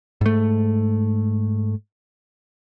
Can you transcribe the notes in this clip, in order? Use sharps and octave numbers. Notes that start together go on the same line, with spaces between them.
G#2 A3